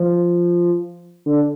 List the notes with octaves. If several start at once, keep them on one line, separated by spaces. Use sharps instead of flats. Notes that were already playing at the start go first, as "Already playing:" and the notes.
Already playing: F3
D3